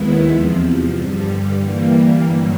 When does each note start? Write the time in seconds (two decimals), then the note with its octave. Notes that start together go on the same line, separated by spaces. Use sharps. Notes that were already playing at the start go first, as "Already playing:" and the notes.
Already playing: D#2 D#3 G#3 B3 E4
0.27 E2 C3 F3
0.93 G2 D3 G3
1.59 E3 G3 A#3
2.25 G2 D3 F#3